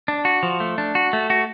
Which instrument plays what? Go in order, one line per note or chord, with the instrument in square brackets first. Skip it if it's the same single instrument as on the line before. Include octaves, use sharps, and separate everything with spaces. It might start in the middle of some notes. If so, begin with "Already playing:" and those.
[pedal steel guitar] D4
F#4
F3
A3
D4
F#4
A3
F#4